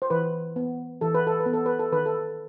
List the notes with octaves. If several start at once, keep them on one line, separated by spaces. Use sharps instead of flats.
C5
E3 B4
B3
E3 A4
B4
A4
B4
B3
A4
B4
A4
D#3 B4
A4